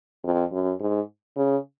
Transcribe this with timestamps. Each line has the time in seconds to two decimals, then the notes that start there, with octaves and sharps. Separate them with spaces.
0.24 F2
0.52 F#2
0.80 G#2
1.37 C#3